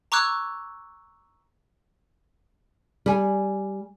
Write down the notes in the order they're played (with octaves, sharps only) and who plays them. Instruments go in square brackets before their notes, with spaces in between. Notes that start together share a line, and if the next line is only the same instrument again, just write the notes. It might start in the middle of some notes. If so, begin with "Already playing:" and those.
[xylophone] A#5 C#6 D6 E6 F#6 G#6
[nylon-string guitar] G3 G#5